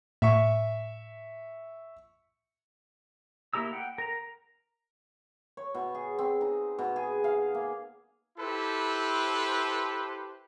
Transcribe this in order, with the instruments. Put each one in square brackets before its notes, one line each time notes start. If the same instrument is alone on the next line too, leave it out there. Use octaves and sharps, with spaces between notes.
[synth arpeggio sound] A2 [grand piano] E5 C#6
[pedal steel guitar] A#3 E4 G4 A#5 E6
F#5 G5
A#4 A#5
[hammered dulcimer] C#5
B2
G#4
C4
D#4
B2
G#4
F5
A#3
[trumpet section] E4 G4 A4 B4 C5